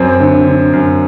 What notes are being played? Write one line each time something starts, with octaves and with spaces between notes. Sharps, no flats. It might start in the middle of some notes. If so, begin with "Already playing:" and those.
Already playing: F#2 C4
D3
D3
F#2